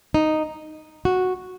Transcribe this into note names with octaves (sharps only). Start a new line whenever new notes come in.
D#4
F#4